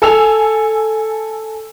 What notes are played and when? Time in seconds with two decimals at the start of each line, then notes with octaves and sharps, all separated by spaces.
0.02 A4 G#5 E6 F7